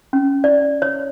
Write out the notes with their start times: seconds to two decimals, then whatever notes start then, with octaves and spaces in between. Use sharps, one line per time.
0.13 C#4
0.44 D5
0.82 C#5